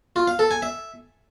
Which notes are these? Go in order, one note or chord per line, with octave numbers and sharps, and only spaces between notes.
F4
F5
A4
G#5
E5